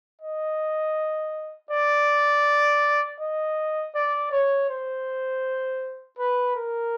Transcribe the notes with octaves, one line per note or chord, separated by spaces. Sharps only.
D#5
D5
D#5
D5
C#5
C5
B4
A#4